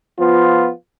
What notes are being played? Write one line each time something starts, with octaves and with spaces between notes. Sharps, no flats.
F3 B3 F4